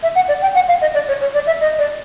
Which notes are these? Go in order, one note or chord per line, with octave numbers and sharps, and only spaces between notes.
E5
F#5
D5
G5
F#5
F5
D#5
D5
C#5
C#5
D5
E5
D#5
D5